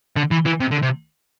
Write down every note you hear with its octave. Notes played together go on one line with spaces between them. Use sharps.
D3
E3
E3
C3
D3
C3